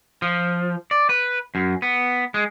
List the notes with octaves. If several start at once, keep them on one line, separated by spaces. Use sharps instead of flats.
F3
D5
B4
F#2
B3
G#3